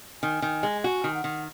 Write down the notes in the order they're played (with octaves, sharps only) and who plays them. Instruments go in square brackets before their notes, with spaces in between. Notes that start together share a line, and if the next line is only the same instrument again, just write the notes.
[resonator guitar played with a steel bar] D#3 [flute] G#5
[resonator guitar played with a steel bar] D#3
G#3
[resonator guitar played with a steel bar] F#4 [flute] G#5
[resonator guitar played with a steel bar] D#3
[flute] F#5
[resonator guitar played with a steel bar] D#3